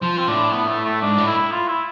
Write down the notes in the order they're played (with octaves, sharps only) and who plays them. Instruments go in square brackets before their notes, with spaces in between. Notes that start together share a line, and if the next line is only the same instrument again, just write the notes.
[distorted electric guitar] F3 [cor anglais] C5
[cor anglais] C4
[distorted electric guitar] A2 [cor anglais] D4
[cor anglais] B3
A3
A3
[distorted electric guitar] G#2 [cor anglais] D4
[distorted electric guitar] A2
[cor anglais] E4
F4
E4